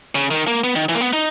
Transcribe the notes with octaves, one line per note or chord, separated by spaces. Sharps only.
C#3
D#3
A#3
B3
D#3
E3
A#3
B3
D#4